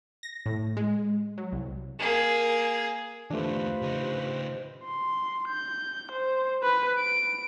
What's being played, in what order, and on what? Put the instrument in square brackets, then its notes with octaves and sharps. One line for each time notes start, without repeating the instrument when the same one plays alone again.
[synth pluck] A#6
A2
G#3
F#3
C2
[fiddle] A#3 G#4
[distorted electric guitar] E2 D3 [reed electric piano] A3 D4 [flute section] F4 B4 C5 [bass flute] G4
[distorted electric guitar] C#3 D#4
[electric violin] C6
G6
C5
B4
D7